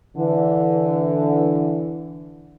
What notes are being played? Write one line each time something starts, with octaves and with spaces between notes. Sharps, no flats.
D3 E3